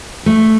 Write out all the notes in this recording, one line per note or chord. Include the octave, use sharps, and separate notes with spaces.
A3